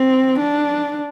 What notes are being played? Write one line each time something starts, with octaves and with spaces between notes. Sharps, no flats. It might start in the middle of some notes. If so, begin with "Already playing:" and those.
Already playing: C4
D4